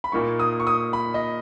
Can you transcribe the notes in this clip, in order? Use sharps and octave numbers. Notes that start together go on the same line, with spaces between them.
B5
A#2 A#3 D#4 C#6
D#6
C#6
D#6
B5
D#5